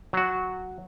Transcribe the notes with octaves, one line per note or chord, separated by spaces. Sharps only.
F#3 F#4